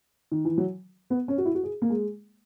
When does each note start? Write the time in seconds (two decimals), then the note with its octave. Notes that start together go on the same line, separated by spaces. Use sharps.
0.32 D#3
0.45 E3
0.58 F#3
1.10 B3
1.28 C#4
1.38 F#4
1.46 E4
1.55 F#4
1.64 G#4
1.82 A#3
1.90 G#3